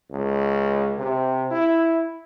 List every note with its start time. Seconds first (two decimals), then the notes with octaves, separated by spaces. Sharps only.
0.11 C#2
0.98 C3
1.51 E4